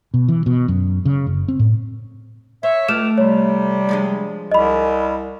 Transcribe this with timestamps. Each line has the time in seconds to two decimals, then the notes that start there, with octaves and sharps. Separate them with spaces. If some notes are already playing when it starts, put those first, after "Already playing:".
0.14 B2
0.28 E3
0.46 B2
0.68 F#2
1.05 C#3
1.27 F#1
1.48 C4
1.59 A2
2.63 C5 C#5 E5
2.88 C#2 A3 D6 F6 E7
3.18 C3 G3 C#5
3.89 F3 G#3 D4
4.51 C2 D#5 B5